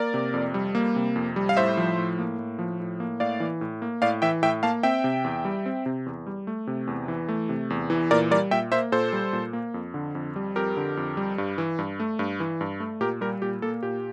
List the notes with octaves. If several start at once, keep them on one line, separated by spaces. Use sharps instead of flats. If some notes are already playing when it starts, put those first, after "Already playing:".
Already playing: A#3 A#4 D5
C3
F2
G3
A#3
C3
F2
G3
F5
A2 C5 E5
F3
A2
A#3
A2
F3
A2
A#3
A2 D5 F5
E3
A2
A#3
A2 D5 F5
E3 E5 G5
A2 E5 G5
A#3 F5 A5
C4 E5 G5
C3
E2
G3
C4
C3
E2
G3
A3
C3
E2
E3
A3
C3
E2
E3
A#2 A#4 D5
G3 A#4 D5
A#2 E5 G5
A#3 C5 E5
A#2 A4 C5
G3
A#2
A#3
F2
D3
F2
G3
F2 G4 A#4
D3
F2
G3
G2
E3
G2
A3
G2
E3
G2
A3
A#2 G4 A#4
G3 G4 A#4
A#2 G4
A#3 A4
A#2 G4